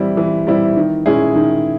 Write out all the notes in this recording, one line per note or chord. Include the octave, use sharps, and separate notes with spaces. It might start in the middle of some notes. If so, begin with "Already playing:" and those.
Already playing: E3 G3 C4 E4
E3
G3 C4 E4
D#3
G#3 C#4 E4 G#4
D#3